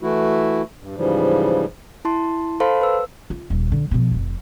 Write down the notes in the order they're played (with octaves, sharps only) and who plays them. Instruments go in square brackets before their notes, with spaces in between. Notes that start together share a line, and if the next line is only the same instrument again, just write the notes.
[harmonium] E3 A3 E4 F#4
G2
G#2 C#3 E3 F3 G3
[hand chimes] E4 A5 C6
A4 C5 F5 A5 B5 C6
B4 E6
[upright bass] F4
D#1
D3
B2 F3
F1 F2